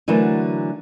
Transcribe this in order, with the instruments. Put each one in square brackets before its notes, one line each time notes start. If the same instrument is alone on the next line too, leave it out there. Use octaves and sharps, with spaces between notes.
[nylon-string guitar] D3 E3 F#3 A3 F#4 A#4